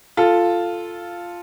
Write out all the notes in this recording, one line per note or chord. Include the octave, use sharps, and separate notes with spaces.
F4 A4